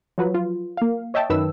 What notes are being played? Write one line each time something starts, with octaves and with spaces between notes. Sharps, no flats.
F3 F#3 B4
F4
A#3 F5
C#5 D#5 E5 G5 A5
F#2 D#3 B4 E6